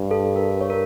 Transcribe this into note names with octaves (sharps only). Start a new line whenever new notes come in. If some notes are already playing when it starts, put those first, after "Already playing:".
Already playing: G2
A4
A#4
C#5
A#4